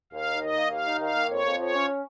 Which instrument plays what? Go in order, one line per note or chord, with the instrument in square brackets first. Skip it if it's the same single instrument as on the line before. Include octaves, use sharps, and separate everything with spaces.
[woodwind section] D#2 [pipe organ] F5
[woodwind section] D#4
[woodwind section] D#3 [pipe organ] D#5
[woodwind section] A#3
[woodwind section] D#2 [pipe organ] F5
[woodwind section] D#4
[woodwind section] D#3 [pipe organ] F5
[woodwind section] A#3
[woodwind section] F2 [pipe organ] C#5
[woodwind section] F2
[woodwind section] F3 [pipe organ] C#5
[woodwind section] C#4